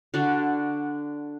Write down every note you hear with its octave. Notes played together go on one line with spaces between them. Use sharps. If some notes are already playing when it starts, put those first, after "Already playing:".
D3 D4 F#4 D5